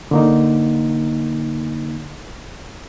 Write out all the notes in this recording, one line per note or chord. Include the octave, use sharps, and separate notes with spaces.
D3 A#3 D#4